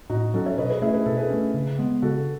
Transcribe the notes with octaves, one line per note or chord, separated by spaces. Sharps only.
A2 D#4 F#4
F#3 C#4 F#4 A4
C#5 E5
B2 B4 D#5
G#4 B4
A3 C#4 E4 G#4
B4
B2 A4
G#4 B4
A3 C#4
C#3
G#3 B3
C#3 F#4 A4